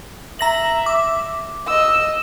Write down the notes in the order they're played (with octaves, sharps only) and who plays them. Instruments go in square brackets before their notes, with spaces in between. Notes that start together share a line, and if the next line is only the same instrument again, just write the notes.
[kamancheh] E5 [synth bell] A#5 A#6 F#7
[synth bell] D6
[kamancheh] D#5 E6